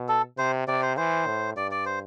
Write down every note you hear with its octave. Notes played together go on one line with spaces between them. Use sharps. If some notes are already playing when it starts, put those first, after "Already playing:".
Already playing: B2
A4
C3 C5
C3 D5
C5
E3 C5
A2
G2 D5
D5
C5